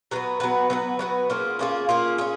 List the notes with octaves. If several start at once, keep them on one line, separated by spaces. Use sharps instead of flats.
F#3 B3 F#4 B4
F#3 B3 F#4 B4
F#3 B3 F#4 B4
F#3 B3 F#4 B4
A#3 C#4 F4 G#4
A#3 C#4 F4 G#4
A#3 C#4 F4 G#4
C#4 F4 G#4